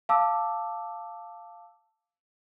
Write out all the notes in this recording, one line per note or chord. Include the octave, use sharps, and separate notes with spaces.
F5 A5 D6 E6